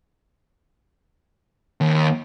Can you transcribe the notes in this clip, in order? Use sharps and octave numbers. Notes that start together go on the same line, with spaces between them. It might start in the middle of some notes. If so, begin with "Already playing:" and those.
D#2